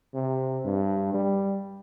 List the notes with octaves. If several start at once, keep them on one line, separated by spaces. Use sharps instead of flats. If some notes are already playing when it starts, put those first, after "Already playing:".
C3
G2
G3